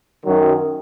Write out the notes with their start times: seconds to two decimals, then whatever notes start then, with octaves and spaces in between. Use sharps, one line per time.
0.24 F#2 D#3 F#3